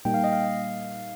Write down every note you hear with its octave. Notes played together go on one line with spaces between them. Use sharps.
A#2 G3 A#3 D#4 G5
F5
D#5
F5